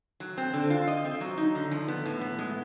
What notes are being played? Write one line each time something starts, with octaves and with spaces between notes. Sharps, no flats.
F#3
C4
D3
F4
D#5
C4
F#3
D#4
D3
F3
B3
A2
B3
G#3